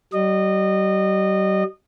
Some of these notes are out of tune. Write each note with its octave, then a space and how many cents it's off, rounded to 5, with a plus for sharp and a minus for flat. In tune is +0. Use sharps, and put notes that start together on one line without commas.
G3 -45 D#5 -25